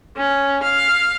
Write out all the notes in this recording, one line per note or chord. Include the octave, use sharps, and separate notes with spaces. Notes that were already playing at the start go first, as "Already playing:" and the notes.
C#4
F5